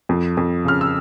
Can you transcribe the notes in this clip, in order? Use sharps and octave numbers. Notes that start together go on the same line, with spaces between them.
F2
F2
C#3 F6
E6